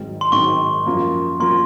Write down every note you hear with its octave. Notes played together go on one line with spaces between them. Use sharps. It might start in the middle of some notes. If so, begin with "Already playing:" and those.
Already playing: G#1 G#2 D#3 F#3 C4
C6
G#1 G#2 D#3 F#3 C4 C#6
F#2 F3 A#3
F3 A#3 C6